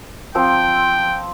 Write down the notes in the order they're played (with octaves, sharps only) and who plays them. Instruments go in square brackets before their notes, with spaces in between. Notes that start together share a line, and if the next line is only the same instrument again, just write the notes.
[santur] F3 C4 C6 [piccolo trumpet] G5